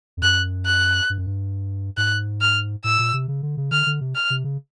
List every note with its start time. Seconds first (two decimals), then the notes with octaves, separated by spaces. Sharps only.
0.17 F2
0.22 F#2 F#6
0.66 F#6
1.10 G2
1.18 F#2
1.27 G2
1.97 G#2 F#6
2.41 F6
2.84 A2 E6
2.99 A#2
3.13 C3
3.28 C#3
3.43 D3
3.57 C#3
3.71 D3 F6
3.86 D3
4.01 C3
4.15 F6
4.30 C3
4.44 C#3